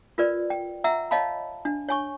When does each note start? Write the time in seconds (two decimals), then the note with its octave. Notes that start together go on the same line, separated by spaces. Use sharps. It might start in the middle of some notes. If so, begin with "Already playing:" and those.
0.18 F4 A#4 B4 D5
0.50 G5
0.84 E5 F#5 A#5 E6
1.11 C#5 D#5 F5 A5 B5
1.65 D4
1.89 C#5 G#5 C#6